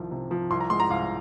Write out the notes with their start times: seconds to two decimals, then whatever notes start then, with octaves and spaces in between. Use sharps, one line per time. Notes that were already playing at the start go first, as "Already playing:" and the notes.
Already playing: C2 D#3 F3
0.11 C3
0.31 F3
0.51 C2 C6
0.61 A#5
0.70 G#3 C6
0.80 A#5
0.90 C2 F5